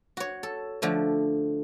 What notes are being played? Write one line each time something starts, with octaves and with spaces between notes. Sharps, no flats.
F#4 C#5
A4
D3 F3 A3